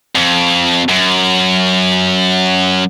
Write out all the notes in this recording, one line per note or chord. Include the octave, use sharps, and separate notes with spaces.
F2
F#2